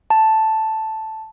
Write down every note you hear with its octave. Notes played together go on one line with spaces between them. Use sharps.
A5